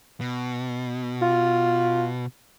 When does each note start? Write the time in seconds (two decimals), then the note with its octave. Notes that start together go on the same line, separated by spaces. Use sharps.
0.21 B2
1.22 F4